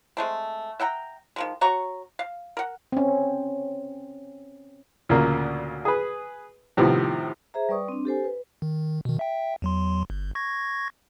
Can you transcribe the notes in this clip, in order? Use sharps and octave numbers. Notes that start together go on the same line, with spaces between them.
G#3 A3 C4
E5 F#5 G5 A#5
D#3 F3 G#3
F#4 C#5 A#5 C#6
F5
A#4 F#5
C4 C#4
D2 A#2 C#3 A#3
G#4 B4
A2 C3 D#3 F3 B3
G#4 C5 E5 A#5
G3 B4 D5 C#6 D#6
C4 D4
G4 A4 C5 G#5
B4
D#3
B2 D#3
E5 G5
E2 F#3 C6
G1
C#6 G#6 A#6